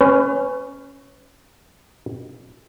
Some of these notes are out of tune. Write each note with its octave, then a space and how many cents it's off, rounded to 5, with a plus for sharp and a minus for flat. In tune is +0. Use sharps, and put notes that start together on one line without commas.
C#4 +0 B4 +35